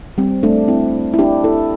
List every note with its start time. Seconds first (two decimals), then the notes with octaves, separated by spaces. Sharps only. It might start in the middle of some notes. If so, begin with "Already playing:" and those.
0.18 G3 C4
0.43 A3 D4
0.68 C4 E4
1.14 E4
1.19 D4 G4
1.44 E4 A4